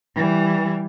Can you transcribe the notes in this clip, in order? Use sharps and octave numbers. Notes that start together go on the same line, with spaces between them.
E3 G3